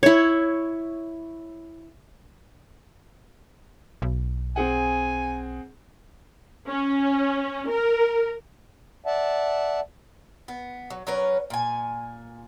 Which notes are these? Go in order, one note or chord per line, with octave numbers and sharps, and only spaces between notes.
E4 C#5
B1
C4 G#4 F#5 G#5
C#4
A#4
D5 E5 F#5 A5
B3
F#3
F#3 C#4 A#4 B4
A#2 G#5